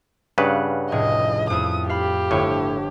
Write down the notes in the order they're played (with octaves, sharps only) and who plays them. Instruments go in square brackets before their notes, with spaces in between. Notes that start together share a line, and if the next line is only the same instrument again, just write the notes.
[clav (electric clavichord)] G2 C#3 B4 [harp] F#5
[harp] F1 A2 G#4 [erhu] D#5
[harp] F2 E4 [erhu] D#6
[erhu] G4 [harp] F5 B5
[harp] G1 C#5 D6 [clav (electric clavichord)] A2